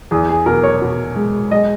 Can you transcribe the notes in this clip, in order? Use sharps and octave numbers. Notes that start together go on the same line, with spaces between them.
E2 G#4
G#4
B2 A#4
C#5
B2
G#3
G#3 D#5